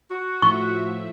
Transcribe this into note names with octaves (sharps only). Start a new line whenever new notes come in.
F#4
A2 F3 E5 C#6